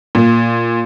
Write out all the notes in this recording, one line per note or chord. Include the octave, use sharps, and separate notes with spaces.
A#2